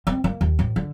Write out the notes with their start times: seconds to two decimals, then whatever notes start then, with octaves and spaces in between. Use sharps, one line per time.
0.07 C4
0.24 A#3
0.41 D#2
0.59 A1
0.76 D3